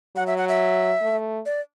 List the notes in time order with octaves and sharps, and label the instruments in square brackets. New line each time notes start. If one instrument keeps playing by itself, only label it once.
[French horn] F#3 [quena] F#5
[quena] E5
F#5
E5
[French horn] A3
[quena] D5